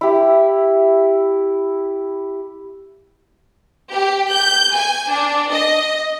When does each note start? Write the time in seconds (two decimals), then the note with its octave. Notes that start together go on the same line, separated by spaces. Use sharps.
0.01 E4 G4
3.91 G4
4.30 G6
4.74 G#5
5.09 D4
5.50 D#5